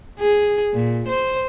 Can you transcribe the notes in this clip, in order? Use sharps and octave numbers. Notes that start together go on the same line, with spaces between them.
G#4
A#2
C5